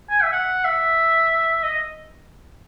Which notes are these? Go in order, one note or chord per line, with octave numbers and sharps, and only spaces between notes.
G#5
E5
F#5
E5
D#5